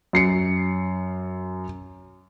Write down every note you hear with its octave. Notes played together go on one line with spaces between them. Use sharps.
F#2 C7 C#7